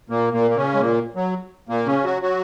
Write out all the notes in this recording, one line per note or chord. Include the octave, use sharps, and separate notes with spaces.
A#2 A#3
A#2 A#3
A#3
C#3 C#4
G#3
A#2 A#3
F#3
A#2 A#3
C#3 C#4
F#3 F#4
F#3 F#4